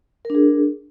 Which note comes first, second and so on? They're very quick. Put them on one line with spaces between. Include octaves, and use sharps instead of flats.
A#4 D4 G#4